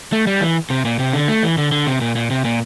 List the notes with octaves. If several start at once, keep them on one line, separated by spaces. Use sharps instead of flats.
A3
G3
E3
C3
A#2
C3
D3
A3
E3
D3
D3
C3
A#2
A#2
C3
A#2